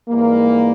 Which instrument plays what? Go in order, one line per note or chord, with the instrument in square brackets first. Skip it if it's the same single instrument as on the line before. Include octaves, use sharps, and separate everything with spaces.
[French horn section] G#2 E3 G3 A#3